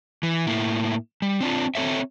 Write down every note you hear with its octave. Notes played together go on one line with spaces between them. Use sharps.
E3
A2 A#3 E4
G3
C4 D4 F4
C4 A4 C#5 E5